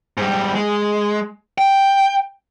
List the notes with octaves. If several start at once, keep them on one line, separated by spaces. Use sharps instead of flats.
G#2 G3
G#3
G5